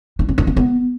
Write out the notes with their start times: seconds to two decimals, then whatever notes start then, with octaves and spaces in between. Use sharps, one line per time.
0.19 D4
0.29 C#4
0.38 D4
0.47 C#4
0.57 B3